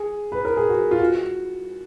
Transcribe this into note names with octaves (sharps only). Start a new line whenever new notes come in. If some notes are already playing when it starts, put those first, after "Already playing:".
Already playing: G#4
B4
A#4
G#4
F#4
F4
F#4